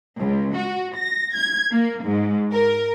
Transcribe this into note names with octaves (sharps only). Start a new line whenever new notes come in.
C#2
F#4
A#6
G#6
A#3
G#2
A#4